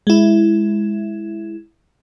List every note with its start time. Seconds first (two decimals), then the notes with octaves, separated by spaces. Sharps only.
0.07 G#3 E4